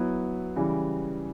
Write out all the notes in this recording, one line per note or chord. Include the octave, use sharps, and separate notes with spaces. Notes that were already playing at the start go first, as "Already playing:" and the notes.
Already playing: F#3 B3 E4
C#3 E3 G3